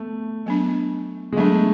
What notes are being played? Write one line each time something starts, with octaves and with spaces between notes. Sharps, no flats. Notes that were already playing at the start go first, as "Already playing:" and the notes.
Already playing: A3 B3
F#3 B3 D4
G#3
F#3 A3 B3 D4